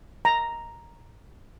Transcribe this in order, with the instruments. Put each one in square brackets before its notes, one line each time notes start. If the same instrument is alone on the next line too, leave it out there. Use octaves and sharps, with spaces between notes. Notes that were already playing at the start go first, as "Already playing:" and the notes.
[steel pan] A#5